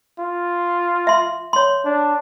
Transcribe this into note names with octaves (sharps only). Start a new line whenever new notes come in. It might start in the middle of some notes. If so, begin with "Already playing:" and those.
F4
E5 C6
C#5 C6
D4